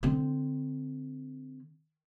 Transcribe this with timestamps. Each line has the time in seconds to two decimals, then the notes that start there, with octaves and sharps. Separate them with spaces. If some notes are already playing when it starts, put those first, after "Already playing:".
0.03 D3 C4